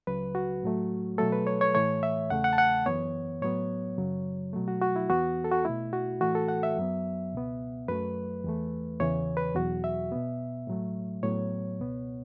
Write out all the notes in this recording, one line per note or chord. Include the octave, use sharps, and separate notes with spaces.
C#2 C#3 F#3 B4
F#4
A2 F#3 A3
B2 F#3 A3 A4
B4
C#5
C#5
A2 E3 A3 C#5
E5
E2 C#3 A3 F#5
F#5
A5
F#5
F#2 E3 B3 C#5
A2 F#3 B3 C#5
F#2 C#3 F#3
B2 F#3 A3
F#4
F#4
E4
E2 E3 B3 F#4
A4
F#4
B2 A3 E4
F#4
A2 E3 A3 F#4
A4
F#5
E5
F#2 F#3 B3
C#2 B2 B3
F#2 F#3 A3 B4
E2 E3 A3
E2 C#3 E3 C#5
B4
E2 B2 F#3 F#4
E5
B2 B3
A2 F#3 A3
A2 F#3 B3 C#5
C#2 B2 B3